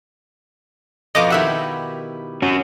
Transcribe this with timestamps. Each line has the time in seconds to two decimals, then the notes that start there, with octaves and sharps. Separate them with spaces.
1.15 F2 B2 F4 D#5 D6
1.30 D#3 E4 G4 E5 F#5
2.42 C#4 F#4